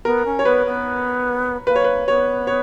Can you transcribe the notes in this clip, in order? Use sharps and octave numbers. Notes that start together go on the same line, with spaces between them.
B3 A#4
C#4
C#5
B3 B4
B3
A#3 B4
C#5
B4
B3 C#5
C#5